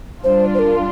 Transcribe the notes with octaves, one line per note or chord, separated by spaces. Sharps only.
G3 D4 F4 C5
C5
A#4